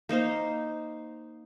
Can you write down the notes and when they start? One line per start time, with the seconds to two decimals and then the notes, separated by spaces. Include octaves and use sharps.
0.09 A#3 D#4 C5 F5